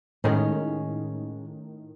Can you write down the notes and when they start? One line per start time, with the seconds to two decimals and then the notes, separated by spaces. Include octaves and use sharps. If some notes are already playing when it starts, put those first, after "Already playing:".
0.24 A2 D#3 G#3 C#4